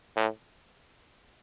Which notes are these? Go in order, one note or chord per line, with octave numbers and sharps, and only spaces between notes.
A2